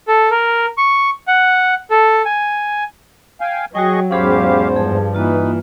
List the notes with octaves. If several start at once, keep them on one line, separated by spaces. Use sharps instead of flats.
A4
A#4
C#6
F#5
A4
G#5
F5 G5 G#5
F#3 F#4 G#4 D#5 G5 C#6
E2 G#2 C#4 G4 G#4 C5 F5 B5
G2 F3 G#4 A5
E3 A#3 D#4 F4 B4